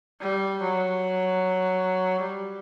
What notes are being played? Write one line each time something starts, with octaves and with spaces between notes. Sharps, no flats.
G3
F#3
G3